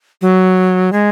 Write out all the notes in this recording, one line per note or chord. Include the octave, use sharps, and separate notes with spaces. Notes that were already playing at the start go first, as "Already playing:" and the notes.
F#3
G#3